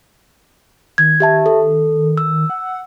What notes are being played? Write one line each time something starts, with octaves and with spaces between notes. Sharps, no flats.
D#3 G#6
G4 E5 A5
A4
E6
F#5